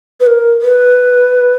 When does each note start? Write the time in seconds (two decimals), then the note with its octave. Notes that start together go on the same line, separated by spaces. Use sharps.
0.20 B4
0.27 A#4
0.61 B4